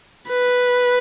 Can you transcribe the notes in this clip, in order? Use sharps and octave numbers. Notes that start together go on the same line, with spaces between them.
B4